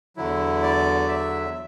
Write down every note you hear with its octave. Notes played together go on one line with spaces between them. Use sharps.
E2 D3 F#3 E4
D5
E5